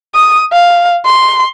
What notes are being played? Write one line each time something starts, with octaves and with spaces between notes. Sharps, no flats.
D#6
F5
C6